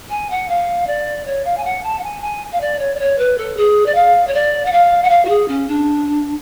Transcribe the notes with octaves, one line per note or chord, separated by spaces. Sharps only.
G#5
F#5
F5
D5
C#5
F5
G#5
F#5
A5
F#5
G#5
G#5
F5
D5
C#5
D5
C#5
B4
A4
G#4
D5
F5
C#5
D5
F#5
F5
F#5
F5
F#4
G#4
C#4
D4